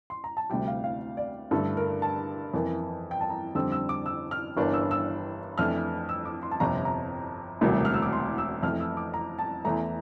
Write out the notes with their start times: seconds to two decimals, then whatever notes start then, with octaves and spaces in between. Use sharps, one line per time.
0.10 C6
0.24 A#5
0.37 A5
0.50 D2 C3 G3 G5
0.68 F5
0.84 F5
1.17 D5
1.51 G2 D3 A3 A4
1.77 A#4
2.02 A5
2.53 F2 E3 A#3
3.11 G5
3.21 A5
3.30 A#5
3.55 F2 D3 G3 C4 E6
3.72 E6
3.89 D6
4.06 E6
4.31 F6
4.57 G1 G2 E3 A#3 D4
4.73 E6
4.91 E6
5.58 F2 E3 A3 D4 F6
6.09 E6
6.26 D6
6.43 C6
6.51 A5
6.60 G1 F2 C3 A#5
6.85 A#5
7.61 E1 D2 C3 G3 A#3
7.85 F6
7.94 E6
8.02 D6
8.13 C6
8.38 E6
8.63 F2 E3 A3 F6
8.80 E6
8.97 D6
9.14 A#5
9.39 A5
9.65 E2 E3 A3 A#5